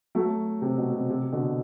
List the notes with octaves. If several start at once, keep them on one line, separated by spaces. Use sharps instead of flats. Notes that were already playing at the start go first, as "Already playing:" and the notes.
F#3 A3
C3
B2
C3
C3
B2 D3